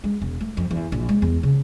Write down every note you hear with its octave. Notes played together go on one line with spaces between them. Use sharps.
G#3
E1
A3
F2
E2
A#1
G#3
E2
C#3